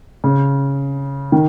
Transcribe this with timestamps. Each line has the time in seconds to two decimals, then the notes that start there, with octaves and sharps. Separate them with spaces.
0.24 C#3
1.32 D#3